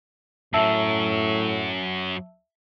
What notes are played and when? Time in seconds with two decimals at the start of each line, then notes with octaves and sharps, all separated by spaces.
0.54 F#2 A2 F#3 E5 A5 E6